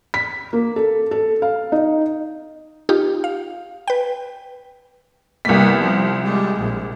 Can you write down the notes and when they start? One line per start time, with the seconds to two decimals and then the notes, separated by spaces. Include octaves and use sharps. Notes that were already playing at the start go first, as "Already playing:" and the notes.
0.14 B6
0.53 A#3
0.76 A4
1.11 A4
1.42 F5
1.72 D#4
2.89 D#4 F4 G4
3.24 F5
3.88 B4 G5
5.45 C2 A#3 B3 B6
5.80 F3
6.24 G3 G#3
6.59 A#1